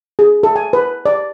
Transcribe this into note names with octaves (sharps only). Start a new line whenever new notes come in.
G#4
A4
G#5
B4
D5